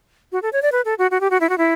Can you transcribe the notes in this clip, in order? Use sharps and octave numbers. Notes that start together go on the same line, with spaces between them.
F#4
A4
C#5
D5
B4
A4
F#4
F#4
G4
F#4
E4
F#4
E4